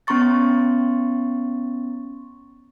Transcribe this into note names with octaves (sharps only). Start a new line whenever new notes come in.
B3 C#4 A#5 C6 C#6 A6